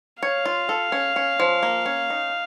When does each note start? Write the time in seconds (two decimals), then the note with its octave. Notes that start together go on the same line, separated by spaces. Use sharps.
0.22 C#5 F5
0.45 F4
0.69 A4
0.92 C#4
1.16 C#4
1.40 F3
1.63 A#3
1.86 C#4
2.10 D#4